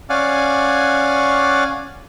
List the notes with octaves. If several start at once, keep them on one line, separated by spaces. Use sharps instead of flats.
C#4 D5 F5 F#5 G#5